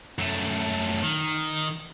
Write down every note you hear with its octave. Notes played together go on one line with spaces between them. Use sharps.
F#2 A3
D#3